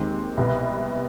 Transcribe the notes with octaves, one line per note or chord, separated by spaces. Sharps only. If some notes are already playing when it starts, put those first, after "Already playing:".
Already playing: D#2 D#3 G#3 C4
C2 B2 B3